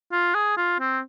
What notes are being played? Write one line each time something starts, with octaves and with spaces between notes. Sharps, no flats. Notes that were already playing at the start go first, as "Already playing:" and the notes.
F4
G#4
F4
C4